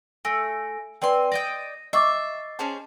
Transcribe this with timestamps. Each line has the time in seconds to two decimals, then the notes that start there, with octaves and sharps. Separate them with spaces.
0.25 A3 G#5 A#6 D7
1.02 C4 B4 D5 G5 G#5 C6
1.32 D5 D#5 G5 A#6 D#7
1.93 D#5 E5 C#6 D6 A6 C7
2.59 C#4 G#4 C5 A5